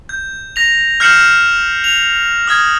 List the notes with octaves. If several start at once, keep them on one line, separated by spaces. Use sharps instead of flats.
G6
A#6 F7
F6 G6 C7 C#7 E7 F#7
F7
D#6 F6 G#6